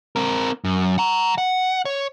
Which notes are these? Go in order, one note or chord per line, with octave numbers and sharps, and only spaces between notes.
C4 A#4
F#2
F#5 A#5
F#5
C#5